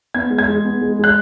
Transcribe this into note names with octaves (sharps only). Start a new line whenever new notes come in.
B3 G#6
G#3
G#6
G#3
B3
G#3
G#3 F#6